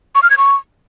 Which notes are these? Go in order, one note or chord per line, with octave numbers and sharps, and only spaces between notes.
C#6
F6
G#6
C#6